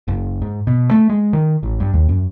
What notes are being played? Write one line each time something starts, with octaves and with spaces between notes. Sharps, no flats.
F#1
G#2
B2
A3
G#3
D#3
A1
G2
D#2
F#2